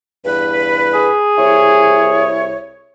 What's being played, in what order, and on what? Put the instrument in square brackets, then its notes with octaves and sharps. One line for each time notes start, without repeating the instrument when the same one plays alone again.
[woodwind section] E2 G2 B4
[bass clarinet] G#4
[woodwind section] C2 E4 C#5